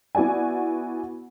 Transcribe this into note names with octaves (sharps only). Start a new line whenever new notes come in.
B3 E4 F#4 D5 G#5